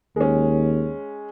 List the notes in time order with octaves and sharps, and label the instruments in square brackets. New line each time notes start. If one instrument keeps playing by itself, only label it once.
[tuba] D#2 [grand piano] G#3 C#4